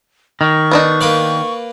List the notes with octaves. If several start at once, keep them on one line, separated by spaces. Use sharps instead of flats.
D#3 C#6
B3 D4 D#4
A#3 B4 D5